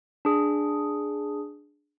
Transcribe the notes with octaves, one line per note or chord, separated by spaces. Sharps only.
D4 G#4